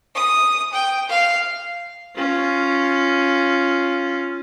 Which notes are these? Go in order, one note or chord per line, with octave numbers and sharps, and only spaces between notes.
D#6
G5
F5
C#4 F4